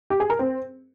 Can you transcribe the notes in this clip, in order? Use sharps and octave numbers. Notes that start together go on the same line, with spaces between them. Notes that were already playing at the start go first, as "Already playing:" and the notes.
G4
G#4
A#4
C4